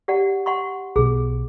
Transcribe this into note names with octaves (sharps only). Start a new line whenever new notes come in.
G4 D5 F#5
F#5 C6 C#6
B1 B2 G#4